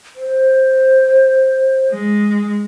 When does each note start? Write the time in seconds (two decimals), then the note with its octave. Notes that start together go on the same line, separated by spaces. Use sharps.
0.16 C5
1.92 G#3